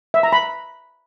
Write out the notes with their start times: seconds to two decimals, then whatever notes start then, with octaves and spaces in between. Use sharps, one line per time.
0.14 E5
0.23 A#5
0.33 B5